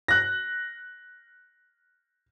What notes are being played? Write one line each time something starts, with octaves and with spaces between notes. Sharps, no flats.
F#6 A#6